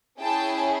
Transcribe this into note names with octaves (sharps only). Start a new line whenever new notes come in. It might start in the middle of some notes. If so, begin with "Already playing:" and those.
C#4 E4 G#4 G5 A5